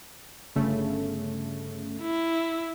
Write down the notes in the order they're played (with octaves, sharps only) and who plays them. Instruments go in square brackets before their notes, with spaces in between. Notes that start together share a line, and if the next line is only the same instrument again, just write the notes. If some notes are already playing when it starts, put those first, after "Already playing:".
[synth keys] G1 C#3 A3
[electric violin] E4